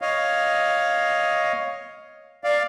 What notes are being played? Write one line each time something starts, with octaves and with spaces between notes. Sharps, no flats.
C#5 D#5 F5
D5 F5